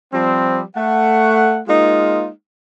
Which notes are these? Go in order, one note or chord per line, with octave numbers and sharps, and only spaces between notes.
F3 G3 C4
A3 F#5
G#3 A#3 D#4 F4